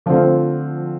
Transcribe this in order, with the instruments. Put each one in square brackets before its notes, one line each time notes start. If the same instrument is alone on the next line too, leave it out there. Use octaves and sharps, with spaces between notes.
[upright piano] D3 A3 C4 F4 [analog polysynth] F3